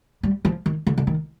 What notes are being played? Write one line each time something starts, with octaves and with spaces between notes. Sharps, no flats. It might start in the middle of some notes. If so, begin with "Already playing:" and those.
G3
F3
D#3
D3
D3
D#3